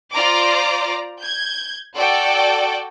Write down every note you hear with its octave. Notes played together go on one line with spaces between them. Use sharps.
F4 C5 D5 A#5 C6 D6
G6 G#6
F#4 A4 D5 G5